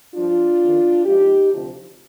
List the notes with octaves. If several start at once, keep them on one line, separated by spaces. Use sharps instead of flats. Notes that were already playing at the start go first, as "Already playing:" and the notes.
G2 F3 D4 F4
F2 D#3
G#2 F3 D#4 G4
D2 C3 F3